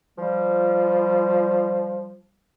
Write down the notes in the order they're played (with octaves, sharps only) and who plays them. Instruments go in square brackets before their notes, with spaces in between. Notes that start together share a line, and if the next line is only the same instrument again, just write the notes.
[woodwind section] F3 G3